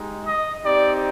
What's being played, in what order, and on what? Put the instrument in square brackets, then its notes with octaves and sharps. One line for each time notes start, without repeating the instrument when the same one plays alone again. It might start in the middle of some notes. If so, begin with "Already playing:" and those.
Already playing: [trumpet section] G#3 D#4 G4
D#5
C4 D#4 G4 D5